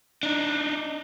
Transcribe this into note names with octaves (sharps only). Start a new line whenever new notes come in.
D4 D#4